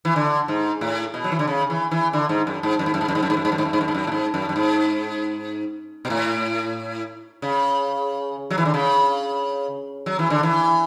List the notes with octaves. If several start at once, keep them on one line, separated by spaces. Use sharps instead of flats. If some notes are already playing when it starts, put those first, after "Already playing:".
E3
D3
G#2
A2
B2
F#3
E3
D3
C#3
E3
E3
D3
G#2
F#2
G#2
F#2
G#2
F#2
G#2
F#2
G#2
F#2
G#2
F#2
G#2
F#2
G#2
F#2
G#2
F#2
G#2
F#2
A2
G#2
F#2
F#2
G#2
B2
A2
C#3
F#3
E3
D3
C#3
F#3
E3
D3
E3